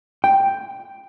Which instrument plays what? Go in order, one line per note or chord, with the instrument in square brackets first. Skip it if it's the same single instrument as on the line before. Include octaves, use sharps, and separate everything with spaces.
[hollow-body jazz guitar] G5